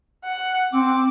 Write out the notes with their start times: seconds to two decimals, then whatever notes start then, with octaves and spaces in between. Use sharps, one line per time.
0.24 F#5
0.73 C4 D6